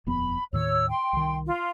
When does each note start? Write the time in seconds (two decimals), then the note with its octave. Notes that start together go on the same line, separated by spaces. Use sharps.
0.07 D#1 F2 B3 B5
0.53 D#2 A2 D#3 C#5 E6
0.90 G5 C6
1.13 C2 D#3
1.47 F4